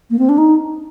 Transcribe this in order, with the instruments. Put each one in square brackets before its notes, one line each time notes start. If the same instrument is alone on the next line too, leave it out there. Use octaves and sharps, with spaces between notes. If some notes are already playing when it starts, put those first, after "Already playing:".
[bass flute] A#3
C4
D4
D#4